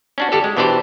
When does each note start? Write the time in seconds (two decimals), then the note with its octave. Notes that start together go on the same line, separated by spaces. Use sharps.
0.18 C#4 D4 F#4
0.32 G1 D4 G4 A4
0.44 G#3
0.57 B2 E3 D4 G4 C5